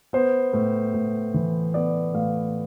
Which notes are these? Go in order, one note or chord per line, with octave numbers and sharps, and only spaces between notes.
B3 C5
A2
A2
E3
B3 D5
A2 F5